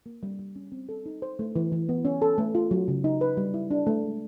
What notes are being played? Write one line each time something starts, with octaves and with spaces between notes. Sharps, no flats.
A#3
G3
G3
C#4
C4
A4
D#4
C5
A3
E3
E3
B3
C#4
A4
A3
F4
F#3
C#3
D#4
B4
G3
E4
D4
A3
G#3